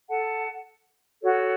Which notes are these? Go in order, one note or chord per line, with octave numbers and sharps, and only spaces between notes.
A4 F#5 A5
F#4 A4 C#5